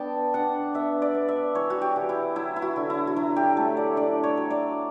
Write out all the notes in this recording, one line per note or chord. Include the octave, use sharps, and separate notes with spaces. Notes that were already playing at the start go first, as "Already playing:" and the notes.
Already playing: B3 D4 D5 G5 A5
D4 F#5
B3 E5
D5
B3
E5
E3 C#5
F#4
G4
E3
E4
F#3 E4
E4
F#4
D3
E4
F#4
F#3 E4
G4
A3 A4
D5
D4 D5
C#5
F#3
D5